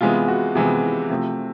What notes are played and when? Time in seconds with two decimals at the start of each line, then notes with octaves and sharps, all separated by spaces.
0.01 C3 E3 G#3 B3 F4
0.28 F#4
0.55 C3 E3 G#3 B3
1.10 C3 F3 A3